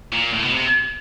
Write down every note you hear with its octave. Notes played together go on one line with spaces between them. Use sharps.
A#2
A2
B2
C3